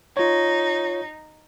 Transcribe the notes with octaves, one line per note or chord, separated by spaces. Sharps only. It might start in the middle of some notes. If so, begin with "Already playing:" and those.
D#4 F4 C#5